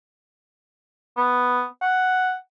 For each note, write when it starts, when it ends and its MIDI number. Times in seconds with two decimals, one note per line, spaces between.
1.17 1.64 59
1.82 2.35 78